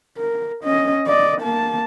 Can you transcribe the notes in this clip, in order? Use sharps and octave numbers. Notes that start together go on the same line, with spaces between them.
A#4
C#4 D#5
D5 D#5
A#3 A5